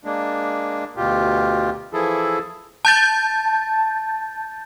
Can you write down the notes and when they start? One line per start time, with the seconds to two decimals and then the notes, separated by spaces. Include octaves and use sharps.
0.05 G#3 A#3 D4
0.97 D2 B2 F4 G4
1.93 E3 F3 E4 G#4 A4
2.85 A5 G6 A6